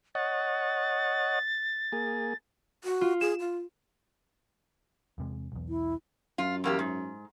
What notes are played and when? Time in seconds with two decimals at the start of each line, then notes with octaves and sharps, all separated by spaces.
0.15 C#5 D#5 F#5 A6
1.92 A#3 G#4
2.84 F#4
3.01 F4
3.21 G#4 E7
3.40 F4
5.18 E2 C3 G#3
5.52 B1 E2
5.69 E4
6.38 F#2 F4
6.64 E2 A#3 G4
6.79 G#2